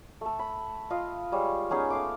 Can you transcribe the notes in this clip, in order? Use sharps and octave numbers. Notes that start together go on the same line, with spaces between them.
A3 A4
B5
F4 D#5 F5
G3 G#3 C#5
B3 C#4 D#4 G#4
A3 F5 D6